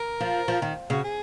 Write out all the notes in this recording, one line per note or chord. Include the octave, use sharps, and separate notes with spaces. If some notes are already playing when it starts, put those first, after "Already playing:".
Already playing: A#4
F3
F3
D#3
C#3 F#4
G#4